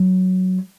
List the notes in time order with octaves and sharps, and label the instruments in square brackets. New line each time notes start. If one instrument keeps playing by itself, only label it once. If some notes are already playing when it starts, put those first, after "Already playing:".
Already playing: [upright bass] F#3